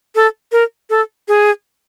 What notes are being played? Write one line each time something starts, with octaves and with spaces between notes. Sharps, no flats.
A4
A#4
A4
G#4